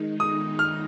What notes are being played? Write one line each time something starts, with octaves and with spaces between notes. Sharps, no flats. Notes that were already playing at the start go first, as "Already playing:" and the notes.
Already playing: D#3 G#3 D#4
D#6
F6